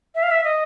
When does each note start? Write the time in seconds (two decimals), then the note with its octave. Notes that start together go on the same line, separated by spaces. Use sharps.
0.15 E5
0.23 F5
0.31 E5
0.44 D#5